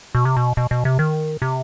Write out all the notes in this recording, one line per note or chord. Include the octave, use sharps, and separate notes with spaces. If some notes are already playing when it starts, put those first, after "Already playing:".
B2
C3
B2
B2
B2
C3
D#3
C3